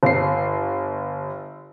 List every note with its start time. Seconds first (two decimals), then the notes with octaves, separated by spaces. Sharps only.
0.03 G1 C7